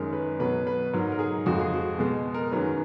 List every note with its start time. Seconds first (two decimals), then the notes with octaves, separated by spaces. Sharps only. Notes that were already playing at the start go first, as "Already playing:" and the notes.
Already playing: F#2 D#3 G#3 A#4
0.13 B4
0.39 B2 F#3 B4
0.67 B4
0.93 G#2 F#3 A#4
1.12 A#4
1.19 G#4
1.46 F2 F3 G#3 F#4
1.60 G#4
1.74 F#4
1.99 B2 G#3 G#4
2.34 A#4
2.52 F#2 D#3 F#3 B4